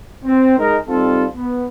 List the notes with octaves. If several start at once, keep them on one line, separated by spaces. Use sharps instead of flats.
C4
G#3 D#4 A#4
G3 C4 D#4 F4 A4
B3